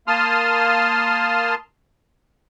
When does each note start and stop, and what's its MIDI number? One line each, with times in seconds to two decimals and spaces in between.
0.08 1.55 58
0.08 1.55 81
0.08 1.55 84
0.08 1.55 87
0.08 1.55 89